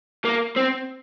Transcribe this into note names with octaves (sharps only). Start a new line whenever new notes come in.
A#3
C4